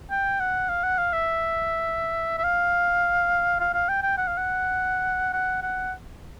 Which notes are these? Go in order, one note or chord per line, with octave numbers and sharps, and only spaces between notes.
G5
F#5
F5
F#5
F5
E5
E5
F5
F5
F5
G5
G5
F#5
F5
F#5
F#5
F#5